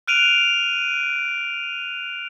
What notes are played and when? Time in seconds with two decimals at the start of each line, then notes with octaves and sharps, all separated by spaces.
0.07 F6 F#6 D7 D#7 F7